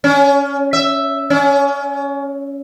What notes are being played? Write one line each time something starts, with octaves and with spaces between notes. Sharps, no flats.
C#4
E5
C#4